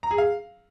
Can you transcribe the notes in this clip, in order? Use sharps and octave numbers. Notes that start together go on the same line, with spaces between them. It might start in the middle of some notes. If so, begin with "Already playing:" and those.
A#5
G#4
F5